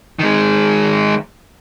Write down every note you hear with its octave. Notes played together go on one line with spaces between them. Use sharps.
D#3 G#3